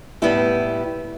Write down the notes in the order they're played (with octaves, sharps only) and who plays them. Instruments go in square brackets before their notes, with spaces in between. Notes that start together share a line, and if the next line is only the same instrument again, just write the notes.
[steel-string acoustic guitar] A2 G3 B3 E4 G4